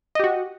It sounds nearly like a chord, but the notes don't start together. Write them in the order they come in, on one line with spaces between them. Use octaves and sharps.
D#5 G4 F#4